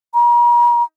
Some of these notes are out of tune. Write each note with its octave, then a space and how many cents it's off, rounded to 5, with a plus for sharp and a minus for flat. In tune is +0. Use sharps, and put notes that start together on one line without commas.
A#5 +40